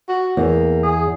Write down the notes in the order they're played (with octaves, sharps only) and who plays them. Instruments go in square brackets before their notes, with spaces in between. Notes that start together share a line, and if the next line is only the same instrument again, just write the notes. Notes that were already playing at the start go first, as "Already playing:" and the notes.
[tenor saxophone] F#4
[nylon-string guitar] E2 [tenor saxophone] A#3
[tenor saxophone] G#4